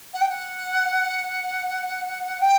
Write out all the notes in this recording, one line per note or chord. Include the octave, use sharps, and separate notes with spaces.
F#5
G5
F#5
G5